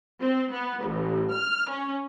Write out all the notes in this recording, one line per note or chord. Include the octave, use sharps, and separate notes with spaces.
C4
B3
A1
F6
C#4